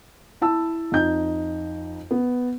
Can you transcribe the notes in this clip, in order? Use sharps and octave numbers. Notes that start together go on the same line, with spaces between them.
E4 A5 E6
F2 D#4 G6
B3